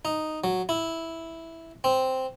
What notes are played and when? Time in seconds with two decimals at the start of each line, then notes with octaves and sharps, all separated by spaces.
0.05 D#4
0.44 F#3
0.69 E4
1.84 C4